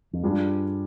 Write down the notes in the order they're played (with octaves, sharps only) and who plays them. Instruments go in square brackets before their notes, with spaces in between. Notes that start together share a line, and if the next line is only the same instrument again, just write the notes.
[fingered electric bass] F2
[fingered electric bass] G2 [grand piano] G3 D4 F4 G#4